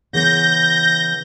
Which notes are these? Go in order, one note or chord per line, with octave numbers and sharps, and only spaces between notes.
C#3 E3 B3 G6 A#6